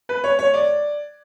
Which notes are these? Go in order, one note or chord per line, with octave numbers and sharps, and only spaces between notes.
B4
C#5
C#5
D5